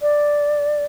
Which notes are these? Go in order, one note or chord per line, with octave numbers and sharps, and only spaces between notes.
D5